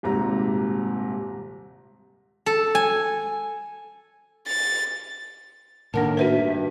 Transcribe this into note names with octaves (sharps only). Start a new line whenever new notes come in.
D#1 G#1 C3 A#5
A4
G#5
A6
A2 D#3 A#3 D4 A#4 F#5 A5
F#4 B4 C5 E5
G2